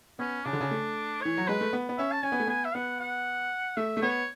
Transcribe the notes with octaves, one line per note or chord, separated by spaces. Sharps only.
B3 C#4
C#3 D4
D3
C#3
A3
E3 C#5
F#3
G#3 B4
A3
B3
B3
C#4 E5
A5
C#4 G#5
B3
A3
B3 G#5
E5
B3 F#5
F#5
A3 E5
A3
B3 C#5